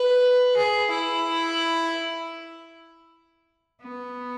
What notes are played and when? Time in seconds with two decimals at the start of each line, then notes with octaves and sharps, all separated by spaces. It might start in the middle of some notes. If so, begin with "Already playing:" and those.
Already playing: B4
0.57 G#4
0.90 E4
3.83 B3